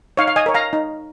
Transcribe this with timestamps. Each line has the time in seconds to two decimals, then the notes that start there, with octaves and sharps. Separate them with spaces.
0.17 D#4 C#5 F5
0.28 F5
0.36 D#5 G#5
0.46 A#4 C#5
0.54 F5 A#5
0.73 D#4